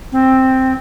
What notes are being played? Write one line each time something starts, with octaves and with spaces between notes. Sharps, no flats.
C4